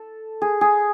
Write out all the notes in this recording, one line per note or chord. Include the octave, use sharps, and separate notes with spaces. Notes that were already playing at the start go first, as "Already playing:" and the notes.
Already playing: A4
G#4
G#4